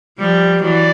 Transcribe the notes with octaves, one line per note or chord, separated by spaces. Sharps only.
F3 G3
E3 F#3 D5